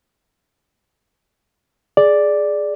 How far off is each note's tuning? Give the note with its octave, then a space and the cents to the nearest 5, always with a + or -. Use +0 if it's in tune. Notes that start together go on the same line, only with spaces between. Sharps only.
G#4 +5 D5 +0